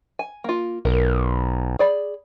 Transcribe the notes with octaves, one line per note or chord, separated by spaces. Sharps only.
G#5
A#3 F4
B1 A#4
G#4 D5 B5